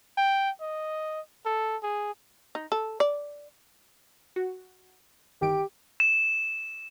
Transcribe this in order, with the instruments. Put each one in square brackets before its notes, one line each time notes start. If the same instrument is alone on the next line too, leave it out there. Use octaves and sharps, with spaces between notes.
[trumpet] G5
D#5
A4
G#4
[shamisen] D#4
A4
D5
[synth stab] F#4
[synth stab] G1 D#3 D7 [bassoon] G4
[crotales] E7